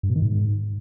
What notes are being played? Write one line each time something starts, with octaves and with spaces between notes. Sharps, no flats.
G2
B2
D#3
G#2